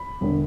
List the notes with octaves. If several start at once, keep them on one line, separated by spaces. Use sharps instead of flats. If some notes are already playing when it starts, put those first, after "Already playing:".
Already playing: B5
E1 D3